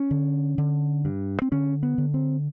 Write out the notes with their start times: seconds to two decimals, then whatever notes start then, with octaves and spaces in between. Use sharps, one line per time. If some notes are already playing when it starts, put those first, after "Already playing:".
Already playing: C#4
0.11 D3
0.58 D3
1.05 G2
1.42 C4
1.52 D3 C#4
1.83 B3
1.98 D3
2.14 C4